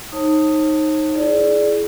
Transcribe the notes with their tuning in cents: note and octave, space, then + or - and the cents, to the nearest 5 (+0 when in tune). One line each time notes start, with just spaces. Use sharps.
D#4 +0 C#5 -45 A5 +25
E4 +35 G#4 +25 D5 +0